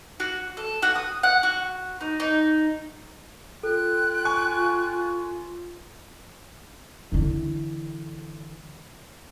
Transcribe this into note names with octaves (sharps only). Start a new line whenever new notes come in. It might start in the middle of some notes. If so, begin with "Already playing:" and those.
F#4
A4
F#4
D#6
F#5
F#4
D#4
D#4
F4 A4 G5 F#6
G#5 C#6
D3 E3